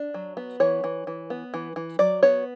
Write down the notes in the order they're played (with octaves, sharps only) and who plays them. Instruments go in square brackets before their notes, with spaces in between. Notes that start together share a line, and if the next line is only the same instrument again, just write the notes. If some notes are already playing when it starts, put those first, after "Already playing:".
Already playing: [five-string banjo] D4
F#3
B3
E3 C#5
E3
E3
B3
E3
E3
F#3 D5
B3 C#5